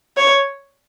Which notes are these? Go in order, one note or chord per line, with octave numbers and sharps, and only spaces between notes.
C#5